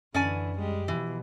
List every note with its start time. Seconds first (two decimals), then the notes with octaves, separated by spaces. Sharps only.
0.14 F#2 D3 E3 C#4 D5 G#5
0.57 G3 G#3 G4
0.88 B2 E3 F3